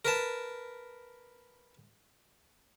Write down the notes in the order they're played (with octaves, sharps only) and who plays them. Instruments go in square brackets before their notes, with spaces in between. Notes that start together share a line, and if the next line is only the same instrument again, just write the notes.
[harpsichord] A#4 B4 A5